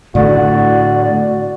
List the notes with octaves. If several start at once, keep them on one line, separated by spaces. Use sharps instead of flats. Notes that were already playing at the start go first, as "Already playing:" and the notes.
A2 D3 A3 F#4 D5